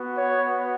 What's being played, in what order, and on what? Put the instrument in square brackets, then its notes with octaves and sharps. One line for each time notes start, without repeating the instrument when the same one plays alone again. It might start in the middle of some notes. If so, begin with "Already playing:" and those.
Already playing: [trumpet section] B3 F#4
C#5